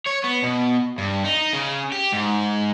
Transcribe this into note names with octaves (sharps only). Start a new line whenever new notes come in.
C#5
B3
B2
G2
D#4
C#3
G4
G#2